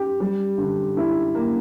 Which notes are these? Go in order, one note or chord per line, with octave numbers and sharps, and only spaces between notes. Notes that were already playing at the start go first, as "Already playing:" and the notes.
Already playing: G4
G3
D3
E4
A#3